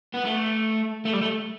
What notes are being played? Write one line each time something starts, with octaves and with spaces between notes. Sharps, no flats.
B3
A3
A3
G3
A3